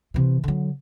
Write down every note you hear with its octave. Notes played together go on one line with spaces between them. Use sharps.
C3 E3
D3 F#3